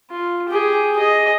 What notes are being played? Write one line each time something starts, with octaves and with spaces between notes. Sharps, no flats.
F4
G4 G#4
G#4 D#5